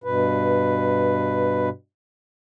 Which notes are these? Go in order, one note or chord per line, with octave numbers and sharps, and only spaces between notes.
G2 B2 B4